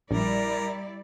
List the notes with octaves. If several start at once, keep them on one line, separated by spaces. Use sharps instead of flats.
A#1 G3 E4 A#4 D5